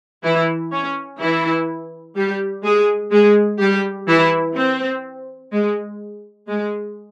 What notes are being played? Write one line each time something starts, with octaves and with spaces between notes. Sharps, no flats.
E3 E4
C#4
E3 E4
G3 G4
G#3 G#4
G#3 G#4
G3 G4
E3 E4
C4
G#3
G#3